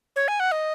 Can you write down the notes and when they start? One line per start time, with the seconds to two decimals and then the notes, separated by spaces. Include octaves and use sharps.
0.16 C#5
0.28 G#5
0.40 F#5
0.52 D#5